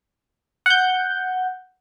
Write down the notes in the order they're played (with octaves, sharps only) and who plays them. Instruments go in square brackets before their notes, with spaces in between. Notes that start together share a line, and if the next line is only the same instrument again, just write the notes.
[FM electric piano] F#5 G6